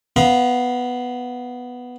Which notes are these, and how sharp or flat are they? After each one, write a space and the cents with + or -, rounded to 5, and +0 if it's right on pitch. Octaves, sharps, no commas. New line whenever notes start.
B3 +0 F5 +0 A#5 +45